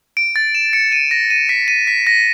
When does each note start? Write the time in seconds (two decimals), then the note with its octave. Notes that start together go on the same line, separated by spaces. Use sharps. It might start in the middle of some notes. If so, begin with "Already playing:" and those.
0.17 D7
0.36 A6
0.55 E7
0.73 C#7
0.92 D#7
1.11 A#6
1.30 D#7
1.49 B6
1.68 D#7
1.87 B6
2.07 A#6